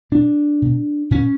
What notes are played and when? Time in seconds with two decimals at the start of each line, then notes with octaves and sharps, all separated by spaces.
0.12 B2 D4
0.62 B2
1.11 A#2 C#4